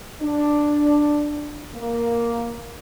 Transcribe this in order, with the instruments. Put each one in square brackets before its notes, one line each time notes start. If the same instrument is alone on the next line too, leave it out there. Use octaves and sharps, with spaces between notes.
[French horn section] D4
A#3